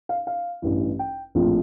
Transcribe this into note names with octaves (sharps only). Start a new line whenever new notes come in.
F5
F5
A1 G2 E3
G5
A#1 A2 F3 C4